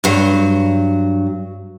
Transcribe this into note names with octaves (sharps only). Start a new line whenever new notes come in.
G2 F#3